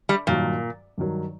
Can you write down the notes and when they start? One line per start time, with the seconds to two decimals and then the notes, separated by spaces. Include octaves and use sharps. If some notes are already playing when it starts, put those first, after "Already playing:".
0.09 G3
0.27 G2 A#2 D#3 F#3
0.98 G2 D#3 F#3